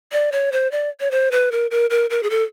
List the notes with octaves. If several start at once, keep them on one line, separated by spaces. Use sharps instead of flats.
D5
C#5
C5
D5
C#5
C5
B4
A#4
A#4
A#4
A#4
G#4
A4